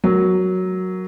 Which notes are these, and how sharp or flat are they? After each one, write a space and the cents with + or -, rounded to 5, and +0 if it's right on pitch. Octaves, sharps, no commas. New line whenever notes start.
F#3 +0 A#4 +0